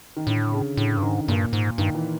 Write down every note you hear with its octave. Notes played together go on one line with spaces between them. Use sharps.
D#3
A2 D3
C#3
A2 D3
G2
G#2 D#3
G2 A#2
G#2
G2 D#3
E3